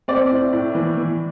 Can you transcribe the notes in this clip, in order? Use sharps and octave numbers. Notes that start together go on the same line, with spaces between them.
C4 D5
A2
A2
E3
E3